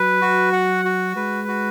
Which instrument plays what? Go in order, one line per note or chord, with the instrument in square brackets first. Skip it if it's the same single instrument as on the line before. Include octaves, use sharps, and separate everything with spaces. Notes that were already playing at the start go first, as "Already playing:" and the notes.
Already playing: [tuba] F#3 [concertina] B4
[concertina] F#4
F#5
F#4
[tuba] G#3 [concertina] B4
[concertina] F#4